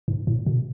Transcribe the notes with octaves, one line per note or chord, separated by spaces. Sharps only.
G#2
A2
B2